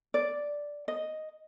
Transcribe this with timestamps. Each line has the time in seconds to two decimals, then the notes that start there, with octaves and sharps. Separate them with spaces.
0.14 D5
0.88 D#5